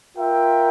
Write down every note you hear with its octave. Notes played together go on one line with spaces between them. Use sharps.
F4 A#4 E5 G5